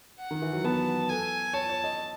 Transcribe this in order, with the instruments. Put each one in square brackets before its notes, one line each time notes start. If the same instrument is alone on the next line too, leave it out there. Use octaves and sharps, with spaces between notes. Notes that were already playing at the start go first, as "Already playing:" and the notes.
[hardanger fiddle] F#5
[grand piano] D#3
E3
F#3
[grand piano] B3 [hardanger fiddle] A5
[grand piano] A4 [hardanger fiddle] G#5
[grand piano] C#5 [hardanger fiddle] A5
[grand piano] C#5
D#5